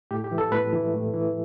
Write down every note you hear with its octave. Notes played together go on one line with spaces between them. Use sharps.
A2 G4
G4
E3
A4
A2 B4
E3
A2
E3